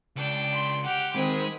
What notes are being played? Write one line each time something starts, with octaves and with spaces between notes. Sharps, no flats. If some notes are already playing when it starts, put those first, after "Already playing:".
C#2 D4 G5
B5 C6
G4 F#5 F6
D#3 G#3 C4 G#5 B5 D#6